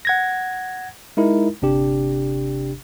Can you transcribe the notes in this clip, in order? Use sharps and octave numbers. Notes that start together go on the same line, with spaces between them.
F#5 G#6 A#6
G#3 D#4 E4 A#4
G1 C3 D4 G4